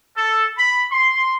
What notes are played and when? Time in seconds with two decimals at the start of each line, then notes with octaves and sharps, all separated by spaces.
0.17 A4
0.58 B5
0.91 C6